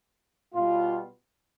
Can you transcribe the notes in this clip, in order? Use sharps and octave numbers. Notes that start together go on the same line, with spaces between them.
B2 G3 B3 F4